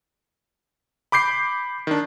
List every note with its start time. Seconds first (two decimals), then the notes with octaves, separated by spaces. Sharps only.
1.12 B5 D6 G6 C7
1.87 D#3 D4